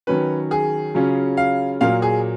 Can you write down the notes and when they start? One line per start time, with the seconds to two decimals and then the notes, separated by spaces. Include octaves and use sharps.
0.07 D#3 F#3 C#4 B4
0.51 G#4
0.95 C#3 F#3 C#4 F4
1.37 F5
1.81 A#2 F#3 A#3 F5
2.02 G#4